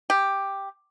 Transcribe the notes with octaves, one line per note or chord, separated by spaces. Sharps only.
G4